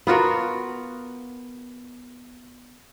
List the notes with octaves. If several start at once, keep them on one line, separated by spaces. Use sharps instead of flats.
B3 F4 F#4 A#4